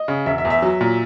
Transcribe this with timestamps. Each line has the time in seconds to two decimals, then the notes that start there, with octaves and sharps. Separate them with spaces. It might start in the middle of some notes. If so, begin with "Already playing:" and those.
Already playing: D#5
0.08 C#3
0.26 E1 E5
0.38 E5
0.45 E2
0.50 E5
0.62 F#3
0.81 A#2